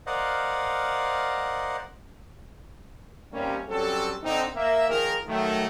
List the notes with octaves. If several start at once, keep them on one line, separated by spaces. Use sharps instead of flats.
A#4 C5 D5 D#5 F5 F#5
D#2 C3 G3 A#3 C#4
F#3 G3 C4 C#4 A4
D3 C4 D#4
A#3 E5
D#3 F3 G#4 A#4
D#3 F#3 A3